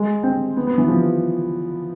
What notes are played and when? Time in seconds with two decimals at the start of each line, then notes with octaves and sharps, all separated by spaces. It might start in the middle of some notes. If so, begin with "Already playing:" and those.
Already playing: G#3
0.23 C4
0.57 B3
0.67 B3
0.78 E3
0.88 F3